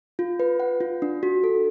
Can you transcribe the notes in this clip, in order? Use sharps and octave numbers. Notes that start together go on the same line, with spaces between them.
F4
B4
F#5
F4
D4
F#4
A4